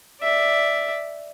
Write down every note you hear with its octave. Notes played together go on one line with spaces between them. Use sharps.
D5 E5